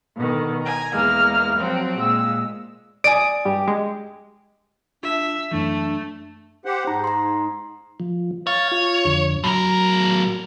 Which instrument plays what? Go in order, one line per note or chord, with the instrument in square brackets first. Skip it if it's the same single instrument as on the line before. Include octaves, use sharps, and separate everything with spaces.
[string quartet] B2 D3 D#3
G#5 A#5
E2 G#3 A#3 F6
F3 F#3 C4 F#4
A#2 G#3 E6
[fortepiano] D5 G#5 [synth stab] D#6 [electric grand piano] D7
[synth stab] G2 [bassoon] G4
[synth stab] G#3
[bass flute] D4 [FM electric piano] F4 [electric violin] E5
[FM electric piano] F#2 E3 [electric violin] A3 [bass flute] D4
[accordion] G4 C5 F#5
[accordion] G#2 [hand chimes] D#4 A#5
[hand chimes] A#5 C6
[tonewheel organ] F3
[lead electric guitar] C#5 [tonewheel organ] F5 A6
[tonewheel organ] F4
F2 D3
[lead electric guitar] A2 A#4 [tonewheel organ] F#3